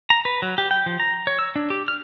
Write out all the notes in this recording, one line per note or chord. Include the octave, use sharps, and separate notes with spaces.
A#5
B4
F#3
G4
G5
F3
A#5
C#5
E6
D4
G4
F6